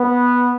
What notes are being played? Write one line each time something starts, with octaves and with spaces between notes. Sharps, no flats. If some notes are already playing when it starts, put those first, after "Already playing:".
Already playing: B3